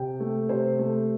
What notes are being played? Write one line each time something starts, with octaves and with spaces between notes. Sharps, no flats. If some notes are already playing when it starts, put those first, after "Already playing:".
Already playing: C3 G5
A3
C3 C5
A3